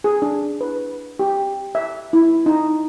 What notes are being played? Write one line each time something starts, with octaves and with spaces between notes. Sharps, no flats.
G#4
D4
B4
G4
E5
E4
D#4